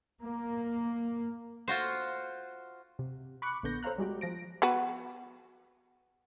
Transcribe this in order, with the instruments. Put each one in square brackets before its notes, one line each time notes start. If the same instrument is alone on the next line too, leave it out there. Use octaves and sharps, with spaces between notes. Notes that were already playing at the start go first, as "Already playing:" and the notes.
[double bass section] A#3
[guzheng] F4 F#4 C5
[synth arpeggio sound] C3
B5 C#6 D6 F#6 C#7
A#1 D3 B3 G6 A#6
A4 C5 C#5 F5 A#5 F#6
G3 G#3 F#4 G4
F3 A#6 D7
[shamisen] B3 F#4 B4